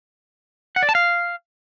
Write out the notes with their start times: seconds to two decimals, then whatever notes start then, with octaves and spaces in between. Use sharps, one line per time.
0.76 F#5
0.83 D5
0.89 A5
0.95 F5